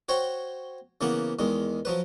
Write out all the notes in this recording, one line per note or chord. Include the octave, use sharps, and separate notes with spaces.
F#4 C5 C#5 G5
C#3 E3 A#3 B3 F#5
E2 D#3 G#3
F3 F#3 B4